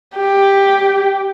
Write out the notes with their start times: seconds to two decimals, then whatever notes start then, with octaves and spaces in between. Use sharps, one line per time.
0.18 G4